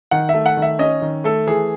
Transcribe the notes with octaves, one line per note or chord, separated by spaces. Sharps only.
D#3 F#5
E5
A3
F#5
D#3
E5
C#4 D#5
D#3
A3 A4
E3 G#4